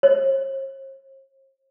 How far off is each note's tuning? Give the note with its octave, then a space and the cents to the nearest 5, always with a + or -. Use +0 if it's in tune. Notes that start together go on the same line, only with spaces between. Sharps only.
C5 +40